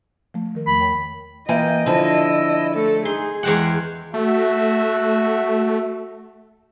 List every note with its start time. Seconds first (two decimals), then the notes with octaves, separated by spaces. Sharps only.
0.34 F3 A3
0.55 D#3 A#4
0.67 E2 F3 A3 B5
0.80 A#4 C#5 G5
1.49 E3 A#3 D#5 G5 G#5
1.86 D3 F3 E4 E6
2.74 A3 A4
3.05 D#4 G#4 C6
3.43 E2 G#3 F#5 G5
4.14 A3 F#4 E5